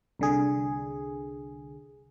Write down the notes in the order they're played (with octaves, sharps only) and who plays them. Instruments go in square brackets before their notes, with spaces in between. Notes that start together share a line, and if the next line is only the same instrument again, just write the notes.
[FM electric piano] C2 D3 G#4